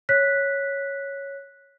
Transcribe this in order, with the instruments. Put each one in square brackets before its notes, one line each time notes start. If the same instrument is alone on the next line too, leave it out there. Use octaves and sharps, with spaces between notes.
[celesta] C#5 F#6 B6